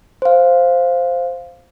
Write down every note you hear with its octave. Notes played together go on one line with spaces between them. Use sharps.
C5 F5